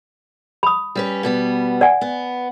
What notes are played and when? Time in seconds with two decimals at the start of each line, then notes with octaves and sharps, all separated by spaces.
0.63 B5 D#6
0.95 G3 C#4 B4
1.23 B2 G3 B3
1.81 D5 F#5 G#5
2.01 B3